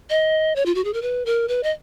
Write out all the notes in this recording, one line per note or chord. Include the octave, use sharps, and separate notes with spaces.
D#5
C#5
F4
F#4
G#4
A#4
B4
A#4
B4
D#5